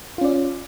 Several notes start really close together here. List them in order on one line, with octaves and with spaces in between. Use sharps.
F4 C#4 D5